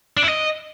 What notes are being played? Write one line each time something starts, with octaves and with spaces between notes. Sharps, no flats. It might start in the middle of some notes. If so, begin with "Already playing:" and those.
D4
E4
D#5